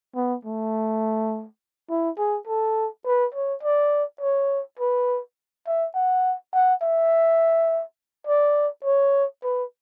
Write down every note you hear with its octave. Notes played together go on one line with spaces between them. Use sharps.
B3
A3
E4
G#4
A4
B4
C#5
D5
C#5
B4
E5
F#5
F#5
E5
D5
C#5
B4